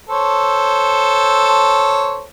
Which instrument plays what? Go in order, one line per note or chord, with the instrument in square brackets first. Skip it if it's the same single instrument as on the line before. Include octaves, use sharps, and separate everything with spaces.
[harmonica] A4 C5 C#5